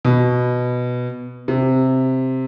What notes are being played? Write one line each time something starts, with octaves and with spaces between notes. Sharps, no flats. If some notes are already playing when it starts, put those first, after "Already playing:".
B2
C3